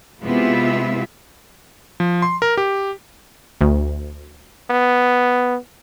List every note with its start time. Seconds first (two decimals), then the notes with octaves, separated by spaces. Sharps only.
0.23 C3 G#3 B3 E4 F4 E5
2.00 F3
2.22 C6
2.42 A#4
2.57 G4
3.61 D2
4.70 B3